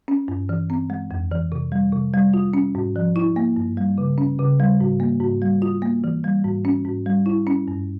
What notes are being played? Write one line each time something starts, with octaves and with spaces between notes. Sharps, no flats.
C#4
G2
E3
C4
G#3
F2
E3
C3
G3
C3
G3
F4
C#4
G#2
F3
E4
A#3
G2
G3
C#3
C#4
C#3
G3
G#2
A#3
G#2
G3
F4
A#3
E3
G3
G#2
C#4
G#2
G3
E4
C#4
G2